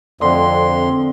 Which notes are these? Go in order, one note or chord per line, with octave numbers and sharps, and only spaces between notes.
F2 D3 C4 C6